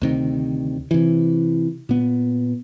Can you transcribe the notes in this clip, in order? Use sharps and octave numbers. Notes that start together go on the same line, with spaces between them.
D2 C3 D#3
C3 E3
A#2 B3